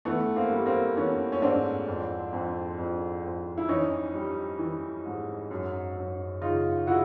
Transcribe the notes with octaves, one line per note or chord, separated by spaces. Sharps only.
E3 A3 B3
A#3 C4
G3
A#3 C4
E3 B3 C#4
C#4
G#2 C4 D4
F2
F2
F2
F2
E4
E3 C#4 D#4
G3
E3
G#2
F#2
F#2
C#3 D#4 F4
C#3 E4 F#4